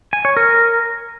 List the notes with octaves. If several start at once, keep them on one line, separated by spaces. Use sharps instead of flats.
G#5
C#5
A#4